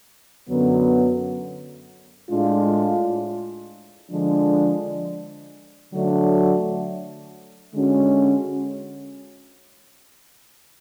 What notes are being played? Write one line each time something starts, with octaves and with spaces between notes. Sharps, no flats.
F#2 D3 F#3 B3
A2 G#3 D4 F4
D3 F3 G#3 D4
D3 F#3 A3 D4
D3 G#3 C#4 F#4